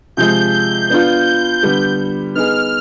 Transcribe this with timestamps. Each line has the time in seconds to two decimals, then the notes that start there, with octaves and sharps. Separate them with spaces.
0.17 C3 F3 G#3 G6
0.53 G6
0.90 B3 D4 F4
1.63 D3 G3 B3
2.35 B3 D#4 G#4 F6